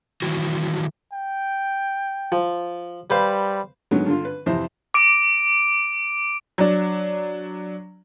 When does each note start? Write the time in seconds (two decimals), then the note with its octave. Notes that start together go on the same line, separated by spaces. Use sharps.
0.22 D#3 E3 F#3 F#4
1.13 G5
2.32 F3
3.10 G3 B4 C5 F5
3.91 D3 D#3 F#3 G#3 B3 C#4
4.06 G2 D3 F4
4.25 B4
4.46 F2 C3 E3 C5 E5
4.94 D6 D7
6.58 F#3 D4